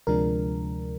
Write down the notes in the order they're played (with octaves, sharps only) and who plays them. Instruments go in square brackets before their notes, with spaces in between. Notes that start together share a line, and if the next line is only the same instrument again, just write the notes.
[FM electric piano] D2 C3 F3 G#3 D4 A#4